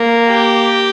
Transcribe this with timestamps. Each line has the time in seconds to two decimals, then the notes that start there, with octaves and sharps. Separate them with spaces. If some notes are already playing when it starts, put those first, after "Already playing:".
Already playing: A#3
0.28 G4